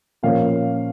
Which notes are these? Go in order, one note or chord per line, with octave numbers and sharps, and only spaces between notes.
A#2 F3 A#3 C#4 F5